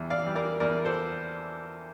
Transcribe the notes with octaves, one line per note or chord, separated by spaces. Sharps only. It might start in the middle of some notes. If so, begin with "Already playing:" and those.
Already playing: E2 E3 G3
D5 F5
E3 G3
A#4 D5
E2 A#4 D5
A4 C5